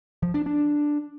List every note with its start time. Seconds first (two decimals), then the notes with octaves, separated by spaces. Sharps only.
0.22 F3
0.34 D4
0.46 D4